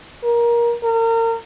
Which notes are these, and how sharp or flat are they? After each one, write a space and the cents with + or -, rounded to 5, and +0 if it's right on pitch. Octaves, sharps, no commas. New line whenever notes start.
A#4 +20
A#4 -35